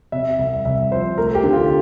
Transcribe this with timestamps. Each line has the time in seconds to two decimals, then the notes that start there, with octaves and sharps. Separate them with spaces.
0.12 C3 E5
0.39 C2
0.65 C2 E5
0.91 F3 C5
1.18 A3 A#4
1.35 G4
1.44 D3
1.53 F4